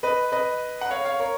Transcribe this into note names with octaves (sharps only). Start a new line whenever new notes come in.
B4 D#5
B4 D#5
F#5
C#5 F5
C#5 F5
A#4 C#5